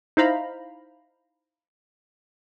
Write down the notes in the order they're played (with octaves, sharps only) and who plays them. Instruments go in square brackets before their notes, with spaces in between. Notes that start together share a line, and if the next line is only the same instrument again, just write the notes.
[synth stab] D#4 E4 C5 F5 A#5 B5